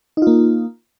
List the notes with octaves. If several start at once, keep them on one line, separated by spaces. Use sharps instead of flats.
A#3 D#4 F4